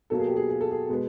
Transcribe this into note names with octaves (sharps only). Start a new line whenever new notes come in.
B2 F#3 A#3 A4
G#4
G4
G#4
G#4
A4
G#4
B2 G#3 B3